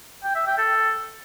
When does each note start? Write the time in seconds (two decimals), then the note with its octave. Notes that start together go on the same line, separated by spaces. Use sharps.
0.24 G5
0.35 E5
0.46 G5
0.58 A4